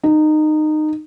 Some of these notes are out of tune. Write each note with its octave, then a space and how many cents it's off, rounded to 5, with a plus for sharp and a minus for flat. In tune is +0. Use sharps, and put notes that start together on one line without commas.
D#4 -20